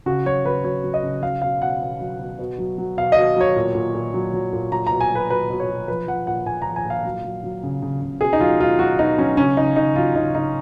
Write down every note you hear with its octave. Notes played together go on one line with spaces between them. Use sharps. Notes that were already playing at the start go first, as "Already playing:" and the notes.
C#3 F#4
F#3 C#5
F#3 B4
F#3 C#5
F#3
D#5
C#3
F#3 F5
B2 F5
B2 F#5
B2
F#3
B2
B2
F#3
F#3
B2 F5
B2 D#5
F#3 C#5
A#2
A#2
A#2
F#3
F#3
A#2
F#3 A#5
B2 A#5
G#5
F#3
B4
F#3 B4
B2
C#5
B2
F3 B4
F3 F#5
A#2 F#5
A#2 G#5
F3 A#5
G#5
A#2 F5
F#3
F#3
F#3
C#3
C#3
C#3
B2 G#4
D#4
F#3 F4
B2 F4
F#3 F#4
B2 D#4
F#3 C#4
C#3 C#4
C#3 D#4
C#3 D#4
F#3 F4
C#3 D#4
C#3 D#4